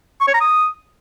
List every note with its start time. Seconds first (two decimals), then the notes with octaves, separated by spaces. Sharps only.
0.21 C#6
0.27 C#5
0.34 A#5
0.41 D#6